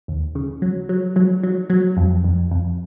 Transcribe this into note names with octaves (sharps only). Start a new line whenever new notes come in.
D#2
C#3
F#3
F#3
F#3
F#3
F#3
F2
F2
F2